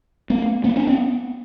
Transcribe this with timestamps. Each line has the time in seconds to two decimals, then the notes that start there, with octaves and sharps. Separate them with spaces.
0.30 A3 B3
0.64 A#3 C4
0.76 C4 D4
0.87 B3 C#4